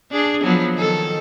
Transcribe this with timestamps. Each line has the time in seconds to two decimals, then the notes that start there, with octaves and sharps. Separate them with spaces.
0.12 D4 G#4
0.43 F3 F#3 B3
0.75 D#3 A4